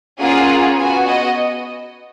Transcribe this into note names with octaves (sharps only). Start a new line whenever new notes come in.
A#3 C#4 F4 G#4 F#5
B3 F#4 G#5
D#5